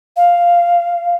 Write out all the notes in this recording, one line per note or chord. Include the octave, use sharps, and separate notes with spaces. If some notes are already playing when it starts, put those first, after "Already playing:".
F5